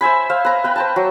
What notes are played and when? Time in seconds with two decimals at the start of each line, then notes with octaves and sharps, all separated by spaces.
0.01 C5 E5 G#5 B5
0.30 C5 E5 F5
0.45 B4 A#5
0.64 B4 G5 B5
0.76 C5 G5 A5
0.96 F#3